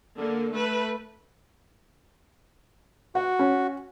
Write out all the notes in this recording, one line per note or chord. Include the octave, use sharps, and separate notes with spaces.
D3 A#3
A3 B4
F#4 F#5
C#4